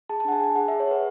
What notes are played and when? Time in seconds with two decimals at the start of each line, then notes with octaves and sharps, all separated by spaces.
0.09 G#4 A5
0.20 A5
0.25 D4 F#5
0.32 G#5
0.40 G#4 F#5
0.55 G#4 F#5
0.68 E5
0.72 G#4
0.80 C#5
0.88 G#4 B4